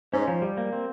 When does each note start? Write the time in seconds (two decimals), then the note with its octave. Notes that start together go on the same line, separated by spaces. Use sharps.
0.14 G#2 C#4
0.28 F3
0.42 G3
0.57 A#3
0.72 C4